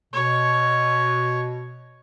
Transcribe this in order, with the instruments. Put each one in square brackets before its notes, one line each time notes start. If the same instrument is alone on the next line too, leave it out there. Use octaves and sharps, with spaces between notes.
[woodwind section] B2 [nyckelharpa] C#5